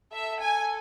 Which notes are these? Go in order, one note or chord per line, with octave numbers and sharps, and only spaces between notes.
A4 E5
G#5